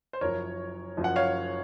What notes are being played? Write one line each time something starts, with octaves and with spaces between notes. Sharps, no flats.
C5
F#1 F#2 F3 A#4 C#5
F#1 F#2 F3
F#5
C#5 F5